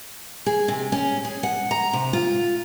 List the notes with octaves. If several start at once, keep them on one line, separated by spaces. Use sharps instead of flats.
G#4
C3
C#4
G#4
F#5
A#5
C3
F4